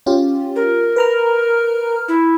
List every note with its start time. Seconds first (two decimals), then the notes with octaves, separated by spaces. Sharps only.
0.06 C#4 F4 G4
0.56 A#4
0.96 B4 A#5 F6
2.08 E4